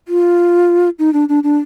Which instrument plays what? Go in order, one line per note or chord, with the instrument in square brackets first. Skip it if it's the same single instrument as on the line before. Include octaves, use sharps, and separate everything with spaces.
[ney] F4
D#4
D4
D4
D4